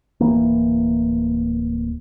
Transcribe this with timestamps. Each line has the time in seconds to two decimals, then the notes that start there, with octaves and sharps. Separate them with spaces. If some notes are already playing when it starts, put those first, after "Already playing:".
0.20 D1 E3 A#3